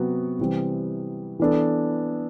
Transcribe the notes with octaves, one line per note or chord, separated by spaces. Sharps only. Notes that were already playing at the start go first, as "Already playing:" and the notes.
Already playing: C3 F#3 B3 F#4
C3 E3 G3 C4
E3 B3 D4 A4